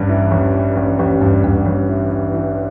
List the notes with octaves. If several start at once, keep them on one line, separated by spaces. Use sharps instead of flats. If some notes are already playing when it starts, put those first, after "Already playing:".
Already playing: A1 G2
E3
A1
E3
A1
A1
G2
G2
A1
E3
E3
E3